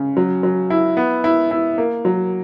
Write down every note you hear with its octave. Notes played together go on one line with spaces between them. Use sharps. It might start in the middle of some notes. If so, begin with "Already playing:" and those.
Already playing: C#3
F#3
F#3
E4
B3
E4
E4
A#3
F#3